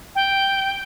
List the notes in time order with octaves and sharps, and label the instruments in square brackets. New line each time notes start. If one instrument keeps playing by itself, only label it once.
[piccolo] G5